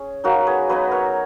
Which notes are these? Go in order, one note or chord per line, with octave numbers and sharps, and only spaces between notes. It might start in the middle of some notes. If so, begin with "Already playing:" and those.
Already playing: C#4 G#4
F#3 A#3 D#4 F#4 A#4
G#4 B4
F#3 B3 D#4 B4 D#5
A#4 C#5